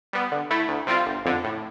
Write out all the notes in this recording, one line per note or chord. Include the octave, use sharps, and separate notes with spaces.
G3 B3
D3
A3 E4
D2
C3 G3 C4 F4
G1
F2 D3
A2